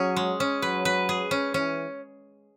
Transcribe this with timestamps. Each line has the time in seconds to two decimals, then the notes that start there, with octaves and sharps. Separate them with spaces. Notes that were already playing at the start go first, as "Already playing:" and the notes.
Already playing: F#3 C#4 G#4
0.16 G#3
0.40 C#4
0.62 F#3 B4
0.85 B4
1.09 G#4
1.31 C#4
1.54 E3 C#4